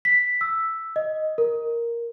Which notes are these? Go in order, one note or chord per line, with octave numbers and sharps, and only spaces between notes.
B6
E6
D#5
A#4